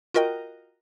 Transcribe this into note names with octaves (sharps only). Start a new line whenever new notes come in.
F4 F#4 A#4 D#5 G5